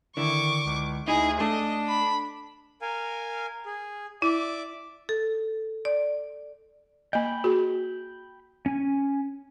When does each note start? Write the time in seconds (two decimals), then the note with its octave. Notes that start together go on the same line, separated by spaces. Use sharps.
0.17 D3 D#3 E4 C#6 D6
0.66 C#2
1.08 D2 D#4 E4 G#4
1.40 A3 D4 D#5
1.88 B5
2.82 A#4 F5 G#5
3.66 G#4
4.22 E4 D5 E5 D6
5.09 A4
5.85 D5
7.13 A#3 D#5 G5 B5
7.44 F#4 G#4
8.66 C#4 G#5